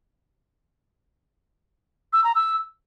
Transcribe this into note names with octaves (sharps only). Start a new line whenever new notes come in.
E6
A#5
E6